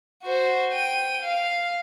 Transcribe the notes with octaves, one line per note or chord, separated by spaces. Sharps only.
F#4 C5
G5 D#7
F5